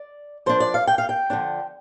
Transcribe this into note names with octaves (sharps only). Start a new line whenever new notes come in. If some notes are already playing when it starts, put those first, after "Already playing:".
Already playing: D5
F3 D4 C5
D5
F5
G5
F5
G5
D3 F3 D4